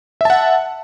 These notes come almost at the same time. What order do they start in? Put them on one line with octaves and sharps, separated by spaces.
E5 A5 F#5